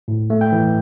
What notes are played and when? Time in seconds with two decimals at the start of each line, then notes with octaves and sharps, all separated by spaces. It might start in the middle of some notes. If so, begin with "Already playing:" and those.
0.08 A2
0.30 A3
0.41 G5
0.52 E3